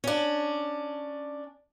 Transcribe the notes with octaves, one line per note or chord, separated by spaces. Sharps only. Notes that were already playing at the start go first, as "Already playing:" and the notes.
C#4 D4